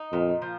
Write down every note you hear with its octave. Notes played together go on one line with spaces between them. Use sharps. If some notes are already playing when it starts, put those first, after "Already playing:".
Already playing: D#4
F2 A#2
F3